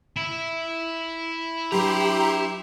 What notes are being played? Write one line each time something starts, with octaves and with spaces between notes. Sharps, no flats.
E4
F#3 D4 G4 B4 A#5 C6